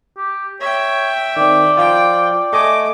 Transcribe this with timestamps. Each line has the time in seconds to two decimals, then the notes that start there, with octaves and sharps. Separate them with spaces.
0.17 G4
0.61 C#5 E5 G5
1.36 D#3 C4 D5
1.77 F3 F4 G5
2.53 A3 D#5 G#5 D6